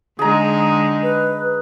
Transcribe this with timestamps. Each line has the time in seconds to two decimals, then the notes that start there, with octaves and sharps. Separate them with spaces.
0.19 D3 G#3 D#4 G#4 A#5
1.03 B4